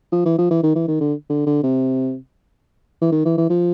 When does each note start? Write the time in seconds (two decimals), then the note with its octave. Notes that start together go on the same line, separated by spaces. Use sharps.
0.12 F3
0.26 E3
0.38 F3
0.51 E3
0.63 D#3
0.76 E3
0.88 D#3
1.00 D3
1.30 D3
1.46 D3
1.63 C3
3.02 E3
3.12 D#3
3.26 E3
3.38 E3
3.50 F3